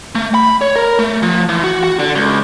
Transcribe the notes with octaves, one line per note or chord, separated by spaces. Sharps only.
A3
B5
C#5
A#4
A3
F3
E3
F#4
F#4
D3
C#2